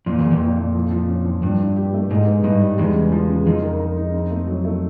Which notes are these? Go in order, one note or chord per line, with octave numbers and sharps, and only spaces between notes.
F2 A#2
E2
A#2
F2
A#2
A#2
F3
F3
C#4
F3
G2 D4
D4
G4
A3
G#2 D#4
B3
G2 D#4
G3
E2 G#3
C#3
F3
C#3
F2 D#4
A#4
A#4
D#4
C4
A3
F#3
A3